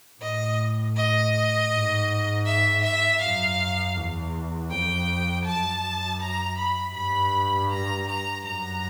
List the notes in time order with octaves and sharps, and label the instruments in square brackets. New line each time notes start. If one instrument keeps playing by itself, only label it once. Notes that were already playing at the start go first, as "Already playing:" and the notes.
[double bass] A2 [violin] D#5
[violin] D#5
[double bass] G#2
[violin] E5
E5
[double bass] F#2 [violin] F5
[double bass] E2
[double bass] F2 [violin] G5
[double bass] F#2 [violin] A5
[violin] A#5
B5
[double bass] G2 [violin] B5
[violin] A#5
A#5
[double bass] F#2 [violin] A#5